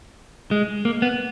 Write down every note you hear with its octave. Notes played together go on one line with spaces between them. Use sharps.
G#3
A#3
B3